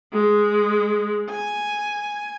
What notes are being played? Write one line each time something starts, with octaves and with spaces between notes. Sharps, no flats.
G#3
G#5